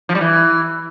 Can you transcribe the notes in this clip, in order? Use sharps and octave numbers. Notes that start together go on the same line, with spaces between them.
F3
G3
E3